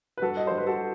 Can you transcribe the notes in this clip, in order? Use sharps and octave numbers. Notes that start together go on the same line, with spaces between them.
B4
G2 F#4 A4
D#5
G2 C5
B4
F#4 A4